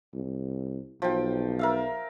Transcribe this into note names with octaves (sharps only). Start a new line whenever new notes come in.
C2
B1 F3 G5
A#4 E5 F5